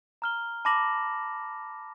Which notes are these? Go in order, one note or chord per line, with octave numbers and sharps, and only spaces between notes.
A#5 F6 G7
A5 B5 D6 A#6 E7 F#7